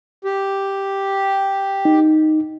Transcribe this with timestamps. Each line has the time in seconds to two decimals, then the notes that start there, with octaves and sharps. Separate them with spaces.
0.24 G4
1.85 D#4